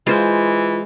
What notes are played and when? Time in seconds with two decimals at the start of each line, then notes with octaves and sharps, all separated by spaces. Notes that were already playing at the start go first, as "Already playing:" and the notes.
0.07 E3 G#3 F4 C5